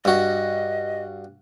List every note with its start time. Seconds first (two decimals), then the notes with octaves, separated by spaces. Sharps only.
0.05 G2 F#4 D#5